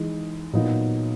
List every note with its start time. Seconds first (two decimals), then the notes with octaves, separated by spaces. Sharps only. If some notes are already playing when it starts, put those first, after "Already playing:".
Already playing: E3 G#3 D#4
0.53 A#2 F#3 B3 D#4